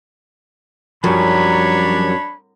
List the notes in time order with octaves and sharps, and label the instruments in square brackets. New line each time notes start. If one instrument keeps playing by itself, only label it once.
[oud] F#2 [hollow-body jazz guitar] F3 G3 [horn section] D4 C#5 [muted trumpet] B5